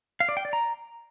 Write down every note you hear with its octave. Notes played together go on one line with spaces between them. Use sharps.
F5
D5
G5
D5
A#5